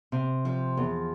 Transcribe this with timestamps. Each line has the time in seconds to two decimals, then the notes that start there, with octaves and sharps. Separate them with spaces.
0.12 C3
0.45 F3
0.77 E2